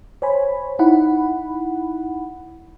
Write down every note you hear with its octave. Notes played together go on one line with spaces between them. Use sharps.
C5 C#5 G#5 B5
D#4 E4 F#5 B5